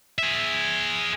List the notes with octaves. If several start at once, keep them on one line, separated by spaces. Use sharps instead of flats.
G#4 E5